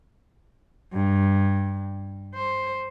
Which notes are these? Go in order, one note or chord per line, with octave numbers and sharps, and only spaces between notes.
G2
C5